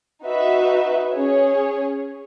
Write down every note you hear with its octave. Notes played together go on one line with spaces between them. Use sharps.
D#4 F#4 B4 E5
C#4 G#4 C#5